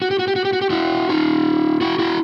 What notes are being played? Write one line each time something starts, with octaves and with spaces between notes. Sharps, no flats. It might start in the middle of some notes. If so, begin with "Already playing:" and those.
F#4
G4
F#4
G4
F#4
G4
F#4
G4
E4 F#4
D#4 F4
E4 F#4
E4 F#4